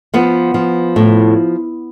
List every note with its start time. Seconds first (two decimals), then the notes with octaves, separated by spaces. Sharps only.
0.14 F3 B3
0.54 F3
0.96 A2